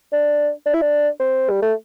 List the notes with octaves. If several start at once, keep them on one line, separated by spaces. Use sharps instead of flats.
D4
D4
E4
D4
C4
G3
A3